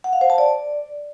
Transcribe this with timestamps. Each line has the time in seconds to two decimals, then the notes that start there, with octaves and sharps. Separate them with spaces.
0.04 F#5
0.13 F5
0.21 C5
0.30 A5
0.38 D5